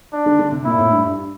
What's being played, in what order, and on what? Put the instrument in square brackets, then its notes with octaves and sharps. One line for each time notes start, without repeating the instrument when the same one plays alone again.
[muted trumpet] D4
[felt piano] D3
D3
C3
[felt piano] A#2 [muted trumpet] E4
[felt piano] A2
G2
G2